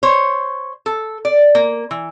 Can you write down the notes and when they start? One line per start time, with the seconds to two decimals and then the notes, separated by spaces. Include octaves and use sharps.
0.03 C5 C#5
0.86 A4
1.25 D5
1.55 A#3
1.91 E3